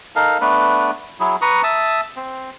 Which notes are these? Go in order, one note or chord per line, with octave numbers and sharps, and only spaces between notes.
D#4 A4 A#4 F5
A3 B3 D4 B4
F#3 E4 G#4
B4 A#5 C#6 D#6
E5 A5 D#6
C4